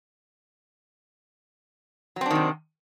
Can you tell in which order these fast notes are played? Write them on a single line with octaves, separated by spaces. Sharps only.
F#3 C4 D4 D#3 C3